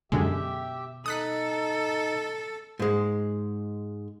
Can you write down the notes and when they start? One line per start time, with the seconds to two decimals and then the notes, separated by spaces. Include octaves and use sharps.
0.12 F#2 B2 D3 G#3 B3 G4 E5
1.06 D#4 A4 D#6 F#6 B6
2.79 G#2 G#3